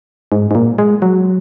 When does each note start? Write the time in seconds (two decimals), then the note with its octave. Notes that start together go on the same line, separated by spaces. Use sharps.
0.32 G#2
0.51 G#2
0.55 A#2
0.78 G#3
1.02 F#3